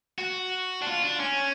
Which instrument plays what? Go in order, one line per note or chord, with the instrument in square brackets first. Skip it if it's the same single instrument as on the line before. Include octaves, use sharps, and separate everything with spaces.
[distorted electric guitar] F#4
D4
F4
D4
C#4